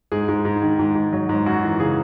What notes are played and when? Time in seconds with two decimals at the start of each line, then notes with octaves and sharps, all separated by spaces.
0.12 G#2 G#4
0.28 G#2
0.45 G#2
0.62 D#3
0.79 G#2
0.95 G#2
1.13 F#3
1.29 G#2
1.46 F#2 F#4
1.63 E3
1.80 C#3 G#4